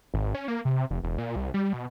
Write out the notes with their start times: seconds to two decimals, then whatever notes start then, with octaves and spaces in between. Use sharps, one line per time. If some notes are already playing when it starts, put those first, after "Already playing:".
0.14 G#1
0.34 C#4
0.48 A#3
0.65 C3
0.90 F1
1.03 E1
1.18 A#2
1.36 C2
1.54 G3
1.73 B2